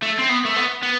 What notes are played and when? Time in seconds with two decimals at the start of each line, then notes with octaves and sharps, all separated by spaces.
0.02 A3
0.19 C4
0.29 B3
0.45 A3
0.56 B3
0.83 B3